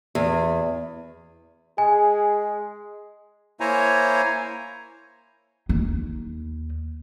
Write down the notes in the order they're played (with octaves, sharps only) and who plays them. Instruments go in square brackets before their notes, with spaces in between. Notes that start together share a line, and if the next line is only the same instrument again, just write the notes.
[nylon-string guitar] E2
[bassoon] G#3 [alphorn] G#4 [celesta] G#5
[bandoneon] A#3 E4 C5 C#5 G#5 A#5
[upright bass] D#2 D#4